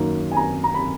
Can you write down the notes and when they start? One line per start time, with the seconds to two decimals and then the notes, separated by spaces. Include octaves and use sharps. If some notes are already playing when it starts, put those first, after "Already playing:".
Already playing: F#2 D#3 A#3
0.31 G#5
0.36 A#5
0.64 A#5
0.74 B5